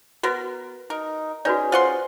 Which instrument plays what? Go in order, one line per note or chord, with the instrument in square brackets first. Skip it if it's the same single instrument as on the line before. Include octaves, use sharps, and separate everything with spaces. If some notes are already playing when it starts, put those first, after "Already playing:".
[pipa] B3 A#4 [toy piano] F#4 B4
[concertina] D#4 [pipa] A#4
[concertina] C#4 G#4 [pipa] D#4 [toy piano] F#4 B4 D5
[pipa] F4 F#5 C6 [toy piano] C5